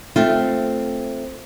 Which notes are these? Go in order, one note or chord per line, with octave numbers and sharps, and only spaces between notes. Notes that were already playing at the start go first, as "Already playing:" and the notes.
A3 C4 F4